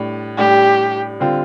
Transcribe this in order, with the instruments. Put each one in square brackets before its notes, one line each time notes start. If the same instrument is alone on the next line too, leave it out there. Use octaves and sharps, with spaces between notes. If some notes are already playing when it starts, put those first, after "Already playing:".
Already playing: [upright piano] A2 G3 D4
[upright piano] A2 G3 D4 [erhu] G4
[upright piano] D3 G3 C4 F4